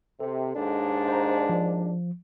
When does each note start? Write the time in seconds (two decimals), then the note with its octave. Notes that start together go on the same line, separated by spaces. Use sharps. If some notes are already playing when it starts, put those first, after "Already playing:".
0.20 C3 A4
0.56 D#2 G#2 D4
1.08 C5 A#5
1.49 F3